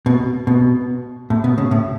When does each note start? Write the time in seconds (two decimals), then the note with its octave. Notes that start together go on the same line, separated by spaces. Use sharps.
0.06 B2
0.47 B2
1.30 A2
1.44 B2
1.58 C#3
1.71 A2